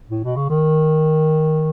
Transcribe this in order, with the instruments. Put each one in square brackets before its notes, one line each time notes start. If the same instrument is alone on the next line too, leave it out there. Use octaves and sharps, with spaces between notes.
[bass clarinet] A2
B2
C#3
D#3